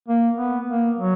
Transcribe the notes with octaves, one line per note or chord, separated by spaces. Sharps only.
A#3
B3
A#3
F#3